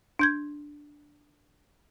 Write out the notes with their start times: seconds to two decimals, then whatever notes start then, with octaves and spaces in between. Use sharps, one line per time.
0.19 D4 G6 G#6